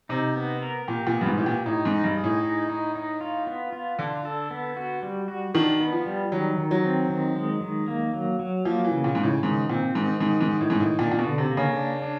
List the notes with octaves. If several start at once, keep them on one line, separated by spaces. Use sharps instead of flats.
C3 D#4
B3
A#4
A#2 G4
A#2
B3
G2
G#2
A2 G4
A#2
A2 D#4
G#2
D#4
G2
G#4
A2
D#4
D#4
D#4
F4
B3
F4
D3 D4
A4
B3
F#4
G3
F#4
D#3 D4
B3
F3
G3
D#3 F#3
D#3
F#3
C4
D#3
G#3
D#3
A#3
F#3
F#3
F3 A#3
E3
C#3
A#2
G#2 C#3
A2
G#2 D#3
A#2 C4
G#2 D#3
G#2 D#3
G#2
D#3
A2
G#2 D#3
A2
A#2 D4
A#2
B2
D3
C3
A#3
C#3
D4
D4